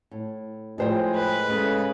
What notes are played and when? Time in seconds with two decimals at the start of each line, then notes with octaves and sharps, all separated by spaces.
0.11 A2
0.78 A2 F3 G#3 D#4 G4 C5 G5
1.15 B4
1.49 C#3 G#3 A4